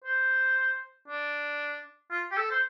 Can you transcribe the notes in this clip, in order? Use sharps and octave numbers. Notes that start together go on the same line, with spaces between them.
C5
D4
F4
G4
A4
C5